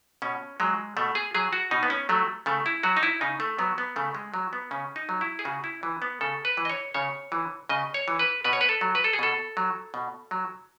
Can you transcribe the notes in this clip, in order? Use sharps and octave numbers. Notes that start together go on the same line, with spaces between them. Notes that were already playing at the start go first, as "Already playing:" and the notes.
B2 C#4
F#3 G#3
B2 A3
G#4
F#3 G#4
F#4
B2 D#4
B3
C#4
F#3 A3
C#3 A3
E4
F#3 F#4
D#4
E4
C#3 D#4
A3
F#3 B3
B3
C#3 A3
G#3
F#3
B3
C#3 C#4
D#4
F#3
E4
G#4
C#3 F#4
E4
E3
B3
C#3 A4
B4
E3
D#5
C#5
C#3 C#5
E3
C#3 D#5
C#5
E3
B4
B2 B4
C#5
B4
A4
F#3
B4
A4
G#4
B2 A4
F#3
B2
F#3